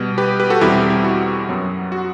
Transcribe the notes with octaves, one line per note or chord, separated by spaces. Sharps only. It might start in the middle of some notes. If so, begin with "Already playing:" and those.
Already playing: B2 G3 B3
G4 B4
G4 B4
F#4 A4
E2 B2 G3 C4 E4 G4
E4
F#4
F#2 F#3 B3
F#4